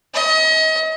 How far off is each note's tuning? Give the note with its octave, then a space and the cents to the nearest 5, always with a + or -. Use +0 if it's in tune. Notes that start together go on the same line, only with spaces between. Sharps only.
D#5 +35